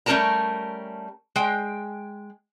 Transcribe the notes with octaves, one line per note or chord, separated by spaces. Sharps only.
G3 A3 C#4 A#4 A5 A#5
G#3 G5